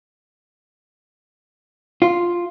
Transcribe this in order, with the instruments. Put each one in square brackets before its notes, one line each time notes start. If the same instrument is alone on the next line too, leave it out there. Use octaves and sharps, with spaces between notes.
[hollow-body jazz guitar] F4